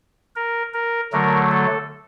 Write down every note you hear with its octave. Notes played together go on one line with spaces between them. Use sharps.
A#4
A#4
D3 F#3 A3 A#4
A4